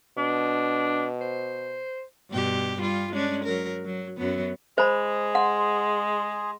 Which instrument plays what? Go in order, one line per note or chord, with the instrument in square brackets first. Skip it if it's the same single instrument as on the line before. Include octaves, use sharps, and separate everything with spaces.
[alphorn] B2 [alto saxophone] D4
[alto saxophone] C5
[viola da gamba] G2 B2 G4
G3 F4
G#3 C#4 D4
F#3 A#4
F#3
F#2 F#3 B3
[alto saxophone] G#3 [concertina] G#4 [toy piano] C5 B5
[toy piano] F#5 [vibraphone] C6